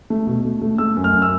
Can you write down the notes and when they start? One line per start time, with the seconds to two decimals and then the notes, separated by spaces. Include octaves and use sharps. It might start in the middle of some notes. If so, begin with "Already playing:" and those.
0.10 A3
0.27 B2
0.45 A3
0.62 A3
0.78 A3 E6
0.97 F#2
1.04 F6
1.13 F#2
1.22 E6